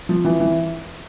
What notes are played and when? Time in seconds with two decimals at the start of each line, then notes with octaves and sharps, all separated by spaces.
0.09 F3
0.25 E3
0.40 E3